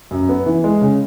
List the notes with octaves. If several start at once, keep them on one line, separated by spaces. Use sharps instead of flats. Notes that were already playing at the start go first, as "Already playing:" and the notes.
F#2
B3
E3
G#3
C#3